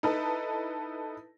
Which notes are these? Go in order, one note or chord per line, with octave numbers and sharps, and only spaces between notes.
D#4 E4 A4 B4